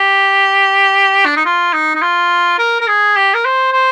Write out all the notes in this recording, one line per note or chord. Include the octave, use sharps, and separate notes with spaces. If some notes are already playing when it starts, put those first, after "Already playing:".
Already playing: G4
D4
D#4
F4
D#4
D#4
F4
A#4
A#4
G#4
G4
A#4
C5
C5